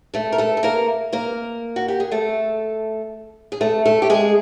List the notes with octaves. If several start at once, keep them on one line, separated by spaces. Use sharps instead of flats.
A3 A4
A#4
A3 A4
A4
A#3 A#4
A#3 A#4
F#4
G4
G#4
A3 A4
G#4
A3 A4
A3 A4
G4
G#3 G#4